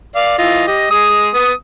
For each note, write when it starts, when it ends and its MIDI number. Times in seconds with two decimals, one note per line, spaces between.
0.15 0.37 74
0.15 0.37 77
0.38 0.66 52
0.38 0.66 65
0.38 0.66 75
0.67 0.89 67
0.67 0.89 75
0.90 1.29 56
0.90 1.29 87
1.34 1.52 59
1.34 1.52 87